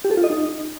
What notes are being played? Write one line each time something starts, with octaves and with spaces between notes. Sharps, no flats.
G4
A4
F4
D#5
D#4